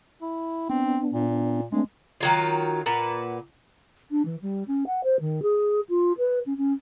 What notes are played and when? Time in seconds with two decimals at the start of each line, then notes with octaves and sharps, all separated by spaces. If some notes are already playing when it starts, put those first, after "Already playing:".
0.22 E4
0.70 B3 C4 D4
1.12 A#2
1.72 G#3 A3 C4 D4
2.20 D#3 F#3 F4
2.86 A#2 B4 F#5
4.11 D4
4.25 E3
4.41 G3
4.67 C#4
4.86 F#5
5.03 C5
5.20 D#3
5.42 G#4
5.89 F4
6.18 B4
6.46 C#4
6.57 C#4